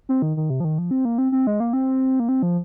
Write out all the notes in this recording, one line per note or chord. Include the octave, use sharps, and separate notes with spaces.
C4
D#3
D#3
C3
F3
D#3
F3
C4
A#3
C4
C4
G#3
A#3
C4
A#3
C4
F3